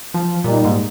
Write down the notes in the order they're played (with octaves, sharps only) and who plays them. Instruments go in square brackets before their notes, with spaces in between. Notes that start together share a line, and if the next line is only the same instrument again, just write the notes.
[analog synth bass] F3
[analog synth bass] A#2 [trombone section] G3 A#3 D#4
[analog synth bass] G#2